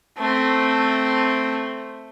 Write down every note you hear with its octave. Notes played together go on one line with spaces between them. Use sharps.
A3 C4